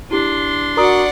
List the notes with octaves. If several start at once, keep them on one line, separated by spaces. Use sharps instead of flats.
D4 E4 G4 C6
F#4 A#4 D5 F#5 A#5 D#6